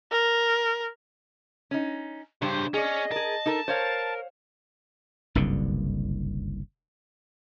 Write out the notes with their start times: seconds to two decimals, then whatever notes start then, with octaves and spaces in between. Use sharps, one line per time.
0.12 A#4
1.71 C#4 D#4
2.42 G2 C#3 G4 C5
2.74 C#4 G#4 D5 D#5
3.12 G#4 A#4 A5
3.46 D#4 A4 A#4
3.68 A#4 C5 C#5 F5
5.35 F#1 C2 G2 D3